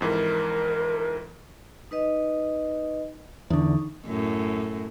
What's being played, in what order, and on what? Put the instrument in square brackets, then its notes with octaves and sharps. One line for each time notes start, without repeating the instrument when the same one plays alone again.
[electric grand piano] F2 G#2 E3 [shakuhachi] A#4
[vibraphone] D#4 B4 D#5
[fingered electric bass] E2 D3 [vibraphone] D#4 C#6
[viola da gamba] F#2 A2